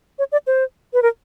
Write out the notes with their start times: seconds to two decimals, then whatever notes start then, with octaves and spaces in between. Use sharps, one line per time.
0.19 C#5
0.32 D5
0.47 C5
0.94 B4
1.02 A#4